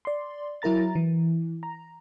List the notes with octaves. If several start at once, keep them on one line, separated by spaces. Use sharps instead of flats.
D5 C6
F#3 E4 A#4 A#5 A6
E3
A#5